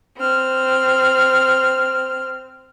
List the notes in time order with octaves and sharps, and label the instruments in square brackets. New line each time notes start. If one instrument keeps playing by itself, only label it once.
[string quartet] C4 F6